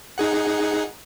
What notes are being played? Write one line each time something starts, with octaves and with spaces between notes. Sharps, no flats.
D#4 G#4 F#5